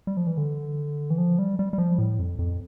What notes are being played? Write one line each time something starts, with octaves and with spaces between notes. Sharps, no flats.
G3
F3
E3
D3
E3
F3
G3
G3
G3
F3
A2
F2
F2